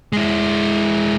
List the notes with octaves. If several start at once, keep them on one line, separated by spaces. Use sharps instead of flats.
G#3 E4